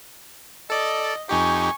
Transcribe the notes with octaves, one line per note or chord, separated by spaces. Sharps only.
A4 D5 D#5
F2 D#4 G4 G#5 C#6